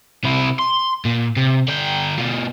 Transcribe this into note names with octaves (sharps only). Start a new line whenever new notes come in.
C3 E4
C6
A#2
C3
D3 G5
B2 F4